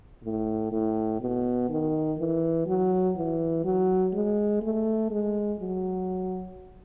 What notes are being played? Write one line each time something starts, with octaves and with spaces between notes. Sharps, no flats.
A2
A2
B2
D#3
E3
F#3
E3
F#3
G#3
A3
G#3
F#3